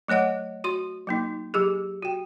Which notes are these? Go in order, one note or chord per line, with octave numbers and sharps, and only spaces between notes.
F#3 A3 C#5 D#5 F#5
F#4 C6
F#3 A#3 D#4
F#3 G4 G#4
F#4 G5